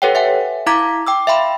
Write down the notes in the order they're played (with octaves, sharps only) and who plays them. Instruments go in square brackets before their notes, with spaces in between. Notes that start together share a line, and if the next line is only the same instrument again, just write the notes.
[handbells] G4 A4 B4 C#5 F#5 G5
E5 F#5 G#5
E4 F5 A#5 D6 G#6 B6
G5 D6 E6
E5 F5 G5 B5 C6